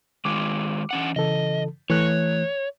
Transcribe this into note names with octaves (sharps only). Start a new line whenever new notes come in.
D#3 G#3 F4 D6
E3 C#4 F#5
C#3 E3 A4 D#5
E3 A3 C#5 F#6